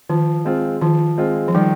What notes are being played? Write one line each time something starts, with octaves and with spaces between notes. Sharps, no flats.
D#3 F3
G#3 C4 F4
D#3 F3
G#3 C4 F4
F3
D#3 G3